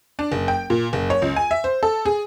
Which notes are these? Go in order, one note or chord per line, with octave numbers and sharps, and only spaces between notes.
D4
F#1
G5
A#2
F#1
C#5
C#2
G#5
E5
C5
A4
G#4